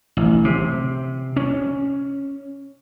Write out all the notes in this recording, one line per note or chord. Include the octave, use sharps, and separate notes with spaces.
A1
C3
C#4